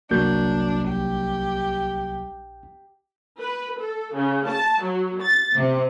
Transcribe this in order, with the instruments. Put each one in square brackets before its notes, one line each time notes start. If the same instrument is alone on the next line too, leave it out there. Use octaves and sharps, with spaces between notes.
[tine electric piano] G1 F#4 G6 [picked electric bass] C2 F#3 A#3 [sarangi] D4
[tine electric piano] A#1 [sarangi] G4
[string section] B4
A4
C#3
A5
F#3
A6
C3